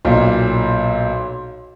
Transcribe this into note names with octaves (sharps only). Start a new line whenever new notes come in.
B1 A#2